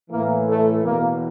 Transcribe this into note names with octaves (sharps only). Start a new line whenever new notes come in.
A2 E3 A#3
A3
E2 B2 A#3